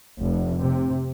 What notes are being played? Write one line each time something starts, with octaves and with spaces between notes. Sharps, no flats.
F1
C3